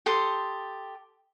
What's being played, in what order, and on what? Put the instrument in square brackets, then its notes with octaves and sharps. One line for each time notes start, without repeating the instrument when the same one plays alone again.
[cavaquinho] G4 A4 C6 D#6